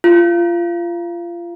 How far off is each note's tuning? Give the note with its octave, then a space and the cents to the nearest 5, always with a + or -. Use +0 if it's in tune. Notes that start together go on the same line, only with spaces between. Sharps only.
F4 -25